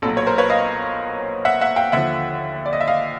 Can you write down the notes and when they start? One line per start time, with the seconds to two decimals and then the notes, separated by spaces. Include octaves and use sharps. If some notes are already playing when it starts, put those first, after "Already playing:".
0.02 B1 A#2 F#3 A4
0.17 C#5
0.27 A#4 C5
0.38 B4 C#5
0.50 D#5 F5
1.45 E5 F#5
1.61 E5 F#5
1.76 F5 G5
1.92 D#2 D3 F3 E5 F#5
2.66 D5
2.73 D#5
2.81 E5
2.88 D#5 F5